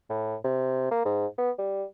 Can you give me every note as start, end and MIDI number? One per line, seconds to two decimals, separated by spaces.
0.10 0.35 45
0.44 0.88 48
0.91 1.02 58
1.05 1.26 44
1.38 1.51 59
1.59 1.84 55